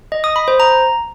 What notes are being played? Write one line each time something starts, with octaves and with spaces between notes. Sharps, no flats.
D#5
D#6
B5
C5
A#5